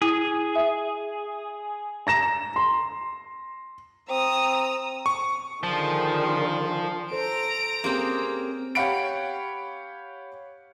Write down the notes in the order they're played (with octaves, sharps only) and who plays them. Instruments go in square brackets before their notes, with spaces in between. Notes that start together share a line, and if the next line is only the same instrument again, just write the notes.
[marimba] E4 [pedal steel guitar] G#4
[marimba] E5
[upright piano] A#5 A#6 E7
C6
[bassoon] C4 [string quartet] A#5 D#6 E6
[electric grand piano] C#6
[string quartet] D3 D#3 G#3 [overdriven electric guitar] F3
[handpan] A4 C5 [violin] A#5 D7
[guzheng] A#3 C4 G5 [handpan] C#4 G4 G#4
[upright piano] G4 C#5 F5 F#5 B5 D7